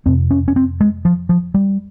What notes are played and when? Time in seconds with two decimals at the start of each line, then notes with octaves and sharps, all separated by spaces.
0.06 F2 C3 C4
0.31 C#4
0.48 C#4
0.56 C4
0.80 G#3
1.05 F3
1.29 F3
1.54 G3